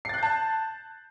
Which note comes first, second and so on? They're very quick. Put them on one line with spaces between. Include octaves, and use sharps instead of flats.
C7 A6 F#6 G6 A5